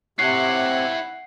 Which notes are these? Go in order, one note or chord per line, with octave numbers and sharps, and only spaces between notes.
C3 E4 C#5 F#5 C7